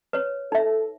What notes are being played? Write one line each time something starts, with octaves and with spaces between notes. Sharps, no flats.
B4 C#5
D#4 A4 E5